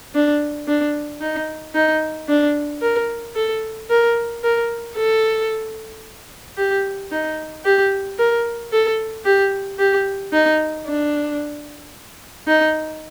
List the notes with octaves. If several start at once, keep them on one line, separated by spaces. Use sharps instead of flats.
D4
D4
D#4
D#4
D4
A#4
A4
A#4
A#4
A4
G4
D#4
G4
A#4
A4
G4
G4
D#4
D4
D#4